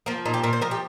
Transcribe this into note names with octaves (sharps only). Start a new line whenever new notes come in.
F3 A#3
A#2 D#4
G4
A#2 A#4
C5
F3 A#4
G4